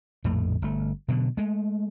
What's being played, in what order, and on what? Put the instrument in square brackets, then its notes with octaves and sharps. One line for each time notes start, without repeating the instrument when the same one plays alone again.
[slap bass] A#1 F2 A2 A3
G1 A3
B2 D3 F#3
G#3 A3